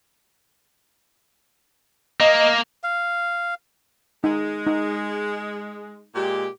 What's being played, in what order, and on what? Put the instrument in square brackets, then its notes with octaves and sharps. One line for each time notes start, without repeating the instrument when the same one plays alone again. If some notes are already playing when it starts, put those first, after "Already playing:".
[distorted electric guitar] A#3 [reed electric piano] D#5
[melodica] F5
[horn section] G#3 [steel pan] D#4
[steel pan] D#4
[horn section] A#2 G#3 G4